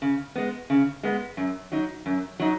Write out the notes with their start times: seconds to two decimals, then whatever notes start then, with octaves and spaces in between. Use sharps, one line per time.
0.02 C#3
0.36 G#3 B3
0.70 C#3
1.03 G#3 B3
1.37 F#2
1.72 F#3 D#4
2.06 F#2
2.40 F#3 D#4